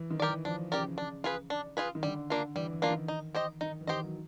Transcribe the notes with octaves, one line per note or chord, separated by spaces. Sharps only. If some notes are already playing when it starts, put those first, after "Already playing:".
Already playing: E3
D#3
G4 A#4 D5
E3
F3 D4
C#3 G4 A#4 D5
D4
F4 G#4 B4
D4
F4 G#4 B4
D#3
D3 G3
A#3 D4 F4
E3 G3
E3
A#3 D4 F4
D#3
D#4
G4 C5 D#5
D#3 D#4
E3
D#3 G4 C5 D#5
F#3